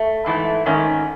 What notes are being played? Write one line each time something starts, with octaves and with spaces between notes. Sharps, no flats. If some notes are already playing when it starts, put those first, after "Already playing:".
Already playing: A3
G#2 E3 A3
G#2 D#3 A3 C#4